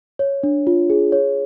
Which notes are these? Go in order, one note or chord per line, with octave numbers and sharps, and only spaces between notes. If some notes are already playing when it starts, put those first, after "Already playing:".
C#5
D4
F4
G#4
C#5